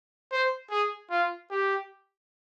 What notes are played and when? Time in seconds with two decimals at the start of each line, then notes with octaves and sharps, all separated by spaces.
0.32 C5
0.70 G#4
1.10 F4
1.50 G4